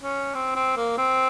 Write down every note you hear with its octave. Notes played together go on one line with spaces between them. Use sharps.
C#4
C4
C4
A#3
C4